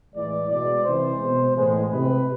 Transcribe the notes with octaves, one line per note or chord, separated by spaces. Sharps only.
A2 E3 G#3 D5
B2 G#3 D5
C3 E3 G#3 C5
B2 G#3
A2 E3 G#3
C3 G#3 B4